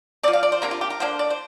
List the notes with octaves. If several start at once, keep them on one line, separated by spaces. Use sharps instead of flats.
F3 C4 D5
F5
D5
C5
C3 A#3 D4 A#4
F4
G4
A#4
D3 A#3 D4 C5
D5
C5